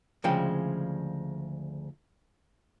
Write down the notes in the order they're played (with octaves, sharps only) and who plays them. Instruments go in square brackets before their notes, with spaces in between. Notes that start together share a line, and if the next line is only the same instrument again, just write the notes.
[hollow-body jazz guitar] D2 C#3 F3 G#3 G5